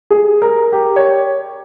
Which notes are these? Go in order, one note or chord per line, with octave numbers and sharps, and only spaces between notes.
G#4
A#4
G4
C#5